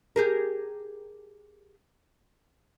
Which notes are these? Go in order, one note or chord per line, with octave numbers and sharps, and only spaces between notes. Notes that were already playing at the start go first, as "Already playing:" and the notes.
G4 G#4 A#4